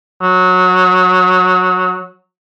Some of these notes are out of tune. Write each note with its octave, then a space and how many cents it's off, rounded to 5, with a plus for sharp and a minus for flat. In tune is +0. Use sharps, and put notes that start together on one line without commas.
F#3 -15